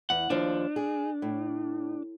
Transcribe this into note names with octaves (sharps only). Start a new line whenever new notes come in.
E2 F#5
D#2 F3 D4
G#4
A2